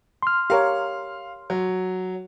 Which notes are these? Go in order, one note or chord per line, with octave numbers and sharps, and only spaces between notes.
C6 F6
G4 A#4 C#5 F5
F#3